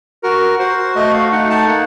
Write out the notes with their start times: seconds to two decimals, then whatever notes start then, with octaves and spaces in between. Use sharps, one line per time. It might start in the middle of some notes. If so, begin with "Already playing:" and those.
0.23 F#4 A#4
0.59 F#4 C5
0.95 A3 D#5
1.13 F5
1.32 D#4 F#5
1.50 A5
1.67 A#3 F#5